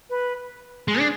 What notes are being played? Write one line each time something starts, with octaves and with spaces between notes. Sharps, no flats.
B4
G#3 G#4
D4